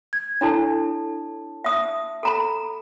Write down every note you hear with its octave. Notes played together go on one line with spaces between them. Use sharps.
G#6
D4 E4 A4 C#5 A5
E5 D#6
A4 A#5 B5